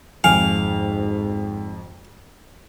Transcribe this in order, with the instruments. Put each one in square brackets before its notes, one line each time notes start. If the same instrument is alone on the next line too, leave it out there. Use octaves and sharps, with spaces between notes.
[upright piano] G#1 F2 [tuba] G#2 [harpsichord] F5 [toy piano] G#5